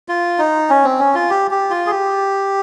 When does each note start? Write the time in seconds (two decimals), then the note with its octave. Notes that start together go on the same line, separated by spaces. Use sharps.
0.09 F4
0.39 D#4
0.70 C#4
0.84 C4
0.99 C#4
1.15 F4
1.30 G4
1.51 G4
1.70 F4
1.87 G#4
1.90 G4